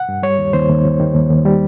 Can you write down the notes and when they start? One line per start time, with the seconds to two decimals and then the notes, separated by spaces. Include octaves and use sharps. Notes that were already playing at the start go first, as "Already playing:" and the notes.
Already playing: F#5
0.09 G2
0.23 G3 C#5
0.38 D#2
0.53 D#2 C5
0.69 D#2
0.85 D#2
1.00 D#3
1.15 D#2
1.30 D#2
1.45 G3